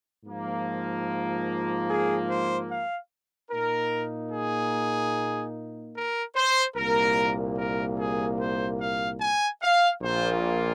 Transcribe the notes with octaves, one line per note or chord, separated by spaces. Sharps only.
G#2 F3 A#3 F4
G#4
C5
F5
A#2 A#3 D#4 A#4
G#4
A#4
C5
C2 A#2 A#3 A#4
A#4
G#4
C5
F5
G#5
F5
A#1 A#2 A#3 F4 C5